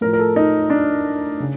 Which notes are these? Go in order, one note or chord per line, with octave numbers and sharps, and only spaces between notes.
A2 F3 A#4
A#4
A4
D#4
D4
C#3